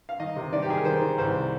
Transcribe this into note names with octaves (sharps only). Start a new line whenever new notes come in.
F5
D#3 D#5
C3
D#3 D5
G4
D#3 G#4
A#4
D#3 C5
D#3
C2 C5